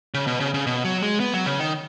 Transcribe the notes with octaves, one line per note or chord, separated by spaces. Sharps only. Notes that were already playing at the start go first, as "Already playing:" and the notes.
C#3
B2
C#3
C#3
B2
F#3
G#3
B3
F#3
C#3
D#3